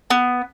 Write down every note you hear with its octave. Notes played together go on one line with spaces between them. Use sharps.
B3